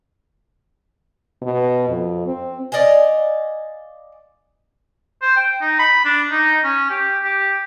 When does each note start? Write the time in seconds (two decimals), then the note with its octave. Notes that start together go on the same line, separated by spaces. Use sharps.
1.42 B2
1.89 F2
2.27 C4
2.72 D5 D#5 F5 G#5
5.22 C5
5.36 G5
5.62 D#4
5.79 B5
6.05 D4
6.31 D#4
6.64 C#4
6.90 G4
7.24 G4